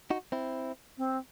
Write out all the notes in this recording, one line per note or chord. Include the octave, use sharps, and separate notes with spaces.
D#4 F#4
C4 E4
C4